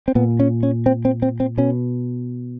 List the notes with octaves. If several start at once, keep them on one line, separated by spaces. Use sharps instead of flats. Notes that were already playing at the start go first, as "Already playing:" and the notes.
C4
A#2 B3
C#4
C#4
C4
C4
C4
C4
B2 C#4